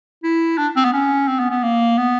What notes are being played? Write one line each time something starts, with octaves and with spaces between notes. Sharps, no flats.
E4
D4
C4
B3
C#4
C4
B3
B3
A#3
B3